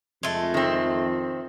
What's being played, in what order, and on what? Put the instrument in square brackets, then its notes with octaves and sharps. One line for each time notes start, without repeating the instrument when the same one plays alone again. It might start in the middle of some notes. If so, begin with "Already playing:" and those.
[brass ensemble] F2 [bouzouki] G#3 A3
[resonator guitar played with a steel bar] D#3 C4